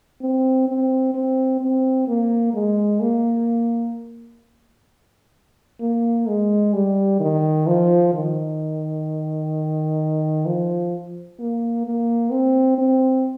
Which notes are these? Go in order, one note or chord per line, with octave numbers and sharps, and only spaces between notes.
C4
C4
C4
C4
A#3
G#3
A#3
A#3
G#3
G3
D#3
F3
D#3
F3
A#3
A#3
C4
C4